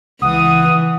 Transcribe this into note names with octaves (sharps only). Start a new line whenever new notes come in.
C#2 E3 F#5 D#6